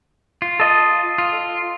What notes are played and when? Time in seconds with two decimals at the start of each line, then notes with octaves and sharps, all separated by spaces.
0.42 F4
0.60 A4 D#5
1.18 F4